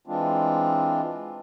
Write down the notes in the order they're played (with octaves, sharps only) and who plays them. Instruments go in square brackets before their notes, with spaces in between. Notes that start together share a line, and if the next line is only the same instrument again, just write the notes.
[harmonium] E3 G#3 C4 D4 F4